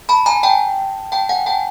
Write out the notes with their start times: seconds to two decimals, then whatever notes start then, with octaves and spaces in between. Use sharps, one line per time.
0.09 A5 B5
0.26 G#5 A#5
0.43 G5 A5
1.12 G5 A5
1.29 F#5 G#5
1.46 G5 A5